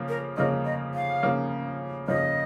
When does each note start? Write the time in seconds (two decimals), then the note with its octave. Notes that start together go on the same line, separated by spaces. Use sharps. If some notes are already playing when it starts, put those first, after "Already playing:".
Already playing: C#3 F3 A#3
0.09 A#4
0.36 C#3 F3 A#3 C#4 D#5
0.65 D#5
0.94 F5
1.22 C#3 F3 A#3 C#4
2.08 C#3 F3 A#3 C#4 D#5